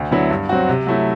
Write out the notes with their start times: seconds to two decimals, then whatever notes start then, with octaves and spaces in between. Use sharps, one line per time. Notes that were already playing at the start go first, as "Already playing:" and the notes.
Already playing: D2
0.11 D3 F#3 B3 E4
0.30 G2
0.49 F#3 C4 F#4
0.69 C3
0.87 F#3 A3 E4